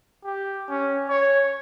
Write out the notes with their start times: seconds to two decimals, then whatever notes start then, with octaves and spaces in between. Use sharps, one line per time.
0.25 G4
0.69 C#4
1.09 C#5